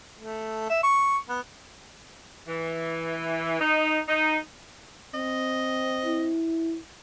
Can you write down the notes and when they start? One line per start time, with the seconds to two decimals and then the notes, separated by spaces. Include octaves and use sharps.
0.18 A3
0.69 E5
0.83 C#6
1.28 B3
2.48 E3
3.61 D#4
4.08 D#4
5.14 C4 D#5
6.05 E4